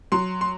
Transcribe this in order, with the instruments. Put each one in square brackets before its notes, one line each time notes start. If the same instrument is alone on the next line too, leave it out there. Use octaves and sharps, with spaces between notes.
[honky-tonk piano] F#3 C6
C6